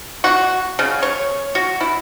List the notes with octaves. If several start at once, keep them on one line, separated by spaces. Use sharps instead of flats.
F#4
C#3
C#5
F#4
E4